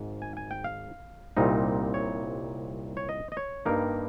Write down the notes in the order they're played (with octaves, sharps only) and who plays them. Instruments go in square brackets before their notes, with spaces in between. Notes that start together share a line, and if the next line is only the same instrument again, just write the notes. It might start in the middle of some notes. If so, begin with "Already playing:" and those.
Already playing: [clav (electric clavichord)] G#1 G#2
G#5
G#5
G5
F5
C2 A#2 G3 C4 D#4
C#5
C#5
D#5
D#5
C#5
G2 G3 A#3 D#4 A#4